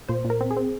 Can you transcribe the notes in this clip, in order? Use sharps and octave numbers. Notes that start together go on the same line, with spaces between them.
A#2 C5
A#2
A#4
C4
G#4
C4